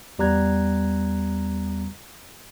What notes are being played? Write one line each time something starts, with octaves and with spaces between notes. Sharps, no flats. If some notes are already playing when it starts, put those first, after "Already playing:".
E2 G3 B3 A#5 F#6 G#6